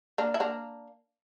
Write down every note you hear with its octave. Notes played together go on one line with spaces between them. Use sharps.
A#3 D4
E4
A#3 D4